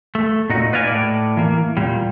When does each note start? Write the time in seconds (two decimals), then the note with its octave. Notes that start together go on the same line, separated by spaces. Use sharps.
0.15 A3
0.50 A#2 D#4 F#4
0.73 B4 D5 D#5 F5 F#5 G#5
0.87 A2 D5
1.37 E3 A#3
1.77 A#2 G3